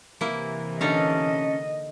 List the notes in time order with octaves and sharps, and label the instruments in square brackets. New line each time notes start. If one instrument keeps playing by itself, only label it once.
[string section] C3 E3 [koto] A#3 E4
[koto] D3 D#4 F5 [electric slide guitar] C#4 A4 [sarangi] D#5